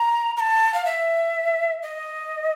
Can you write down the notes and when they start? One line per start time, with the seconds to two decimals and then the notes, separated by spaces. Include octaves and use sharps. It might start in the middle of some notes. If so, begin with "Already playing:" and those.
Already playing: A#5
0.37 A#5
0.40 A5
0.74 F5
0.85 E5
1.83 D#5